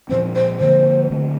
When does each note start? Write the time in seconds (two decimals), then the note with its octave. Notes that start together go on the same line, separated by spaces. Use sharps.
0.09 A#2 F3 C4 C5
0.35 C5
0.60 D3 F3 A#3 C5
1.11 D3 A3 C4